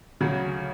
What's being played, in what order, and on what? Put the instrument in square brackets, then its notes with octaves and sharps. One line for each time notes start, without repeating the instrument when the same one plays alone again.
[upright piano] D2 C#3 F#3